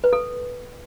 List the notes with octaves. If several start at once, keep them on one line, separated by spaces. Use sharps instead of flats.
B4
A4